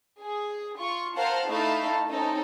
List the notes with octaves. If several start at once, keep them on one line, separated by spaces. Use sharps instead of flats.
G#4
F4 C#6
F4 A#4 C5 F5 F#5 A5
A3 D#4 E4 A4 F5 A5
C4 C#4 D#4 A4